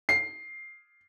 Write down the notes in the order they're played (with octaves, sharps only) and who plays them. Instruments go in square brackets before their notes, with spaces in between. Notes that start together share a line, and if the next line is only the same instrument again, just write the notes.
[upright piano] C7